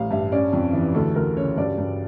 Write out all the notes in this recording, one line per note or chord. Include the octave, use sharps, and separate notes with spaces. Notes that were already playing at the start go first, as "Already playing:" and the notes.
Already playing: A1 G3 F5
G2 E5
C#4 D5
F2
E3
D2 A4
D2 A#4
C#3 C#5
G2 D5
G2